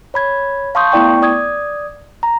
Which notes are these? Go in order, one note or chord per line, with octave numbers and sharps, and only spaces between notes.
C#5 B5 G#6
F5 A5 C6 C#6 D#6 G6
A3 B3 E4 D5 G5 C#6
D5 D#6 G#6
A#5